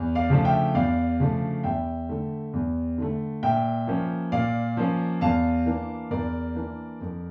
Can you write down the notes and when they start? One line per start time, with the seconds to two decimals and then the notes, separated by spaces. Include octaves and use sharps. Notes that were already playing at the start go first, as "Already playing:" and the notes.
Already playing: E2
0.15 D5 F5
0.30 C#3 F3 A3 D4
0.45 E5 G5
0.74 E2 D5 F5
1.20 C#3 F3 A3 D4
1.64 E2 E5 G5
2.09 D3 A3
2.53 E2
2.98 D3 A3
3.43 A#2 E5 G5
3.87 F3 A#3 C#4
4.32 A#2 D5 F5
4.77 F3 A#3 C#4
5.21 E2 F5 A5
5.66 E3 A#3 D4
6.11 E2 A#4 D5
6.55 E3 A#3 D4
7.01 F2